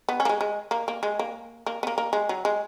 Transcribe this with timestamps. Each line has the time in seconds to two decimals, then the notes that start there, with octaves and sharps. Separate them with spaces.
0.09 B3
0.20 C#4
0.25 A#3
0.29 G#3
0.41 G#3
0.71 A#3
0.88 A#3
1.03 G#3
1.19 A#3
1.66 A#3
1.83 B3
1.87 A#3
1.98 A#3
2.13 G#3
2.29 F#3
2.45 G#3